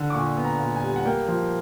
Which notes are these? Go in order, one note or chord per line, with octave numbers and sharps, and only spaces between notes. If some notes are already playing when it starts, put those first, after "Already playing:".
Already playing: D3
D6
A#2 C#6
B3
A#5
A#2
G#5
G3
F#5
A#3 G5
F3